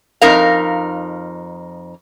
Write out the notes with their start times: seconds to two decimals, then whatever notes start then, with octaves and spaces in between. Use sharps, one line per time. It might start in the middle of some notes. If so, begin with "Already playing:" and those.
0.21 F2 D#4 A#4 F5